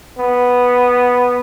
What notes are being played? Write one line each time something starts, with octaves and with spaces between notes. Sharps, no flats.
B3